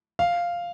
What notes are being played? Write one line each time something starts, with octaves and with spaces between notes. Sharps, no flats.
F5